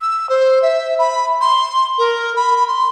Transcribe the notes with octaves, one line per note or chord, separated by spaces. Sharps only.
E6
C5
E5
B5
C6
A#4
B5
C6